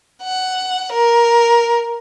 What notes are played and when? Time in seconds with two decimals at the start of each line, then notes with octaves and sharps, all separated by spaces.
0.22 F#5
0.92 A#4